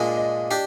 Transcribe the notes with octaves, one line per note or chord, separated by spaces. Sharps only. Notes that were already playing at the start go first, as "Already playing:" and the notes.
Already playing: A#2 G#3 D4 D5 D#5
D#5
D4 G4